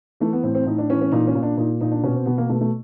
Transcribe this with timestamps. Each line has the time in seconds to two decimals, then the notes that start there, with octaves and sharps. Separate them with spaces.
0.20 E3 A3
0.33 B3
0.43 A2 C4
0.55 C4
0.66 A2 D#4
0.78 D4
0.90 E3 C#4
1.01 C#4
1.12 A#2 D#4
1.27 C#4
1.35 A#2
1.43 D4
1.57 A#2 D#4
1.81 A#2 D#4
1.92 D4
2.03 B2 C#4
2.15 C4
2.26 B2 B3
2.38 A#3
2.50 B2 A3
2.61 A3